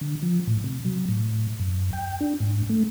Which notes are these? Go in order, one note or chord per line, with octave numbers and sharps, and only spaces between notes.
D3
F3
A2
C3
F#3
A2
F#2
G5
D4
G#2
A3